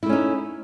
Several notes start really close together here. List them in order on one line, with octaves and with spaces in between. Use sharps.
E4 A3 C#4 D#4